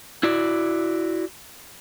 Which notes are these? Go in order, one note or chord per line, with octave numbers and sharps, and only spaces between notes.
E4 F#4 D5